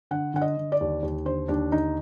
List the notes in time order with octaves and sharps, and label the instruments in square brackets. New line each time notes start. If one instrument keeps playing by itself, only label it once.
[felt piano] D3 F#5
D3 F#5
D#5
D3
D5
D#2
D#2
D3 C5
D#2 D4
D3 D#4